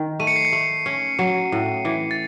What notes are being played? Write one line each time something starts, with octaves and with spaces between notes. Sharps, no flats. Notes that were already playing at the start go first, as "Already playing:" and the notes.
Already playing: D#3
A3 D#7
C#7
C7
C#7
A3
C#4
F#3
A2
E3
A6